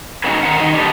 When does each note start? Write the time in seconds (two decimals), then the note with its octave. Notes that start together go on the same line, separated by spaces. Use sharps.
0.24 C#4 D#4 F#4 G#4 B4
0.43 D#3 A#4 C5 F#5
0.60 D#3 D#4
0.74 D4 G4 A4 B4 D#5